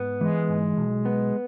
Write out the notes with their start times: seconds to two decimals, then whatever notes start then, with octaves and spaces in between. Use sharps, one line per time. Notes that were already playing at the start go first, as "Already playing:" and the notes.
Already playing: G#2 B3
0.21 E3 G#3
0.49 G#2
0.77 B1
1.06 B3